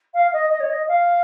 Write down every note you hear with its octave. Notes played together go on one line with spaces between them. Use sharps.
F5
D#5
D#5
C#5
D#5
F5